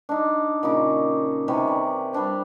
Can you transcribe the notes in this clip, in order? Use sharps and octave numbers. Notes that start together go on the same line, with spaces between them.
D4 D#4
A#2 C#3 D#4 D6
C3 D#3 E3 C#4
D5
G3 C4 D4 C5